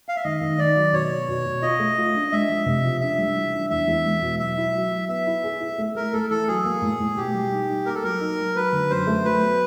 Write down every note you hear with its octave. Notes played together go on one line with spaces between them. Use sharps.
F5
E5
D#3 D#5
D#3
D#3 D5
F#3
B2 C#5
B3
B2
B2
F4 D#5
A3
F4
D4
G#3 E5
F3
C3
F3
D4 E5
G3
E3
D4
E2 E5
E2
G#3
B2
F#3 E5
E4
F#3
F#3
B3 E5
E4
G#4
E4
A3
A3 A#4
A3 A4
E3 A4
F#3 G#4
A#3
A2
A2
B2 G4
G3
D#4
D#4
A#3 A#4
A4
F#3 A#4
D#4
F#3
F#3 B4
D3
F#2 C5
A3
F#3 B4
B3